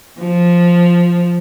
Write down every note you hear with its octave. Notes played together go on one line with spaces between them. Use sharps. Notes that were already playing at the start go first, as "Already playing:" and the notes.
F3